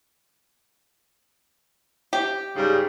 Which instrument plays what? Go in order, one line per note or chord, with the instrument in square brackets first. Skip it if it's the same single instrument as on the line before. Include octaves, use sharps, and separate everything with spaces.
[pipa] G4
[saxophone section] G#2 C#3 G3